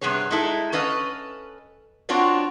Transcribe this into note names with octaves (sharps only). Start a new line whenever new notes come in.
G2 C3 B3 G#4 C#5
G#3 D#4 E4 A4
C#4 A4 B4 D#5 F5
C4 D4 F4 F#4 C#5 D5